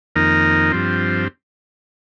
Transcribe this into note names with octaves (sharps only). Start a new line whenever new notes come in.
F2 D#3 A#3 D#4
G2 F3 C4